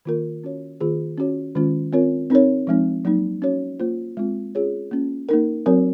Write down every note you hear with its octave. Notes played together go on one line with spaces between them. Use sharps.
D#3 A#3 F4 A#4
C#4 F#4 C#5
D#3 A#3 F4 G#4
C#4 F#4 C#5
D#3 G#3 C#4 F4
C4 F4 A#4 C#5
C4 D#4 A#4 C#5
F3 G#3 C4 D#4
F#3 A#3 D#4
C#4 F#4 C#5
A#3 F4 C5
G#3 C4 F4
C#4 F4 G#4 C#5
A#3 C#4 F4
A#3 D#4 A#4
F#3 C4 F#4 A#4 C#5